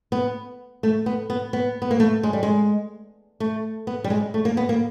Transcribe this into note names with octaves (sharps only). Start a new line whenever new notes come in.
B3
A3
B3
B3
B3
B3
A#3
A3
G#3
G3
G#3
A3
B3
G3
G#3
A3
A#3
B3
A#3